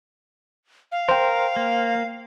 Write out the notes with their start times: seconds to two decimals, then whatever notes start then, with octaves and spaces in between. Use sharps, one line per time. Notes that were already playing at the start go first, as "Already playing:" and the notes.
0.92 F5
1.09 A#4 C5 G5
1.56 A#3